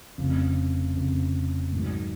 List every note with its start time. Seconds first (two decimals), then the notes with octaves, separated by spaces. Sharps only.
0.18 F1 F2 C#3
0.95 F1 F2 C#3
1.73 G#2 D#3 F#3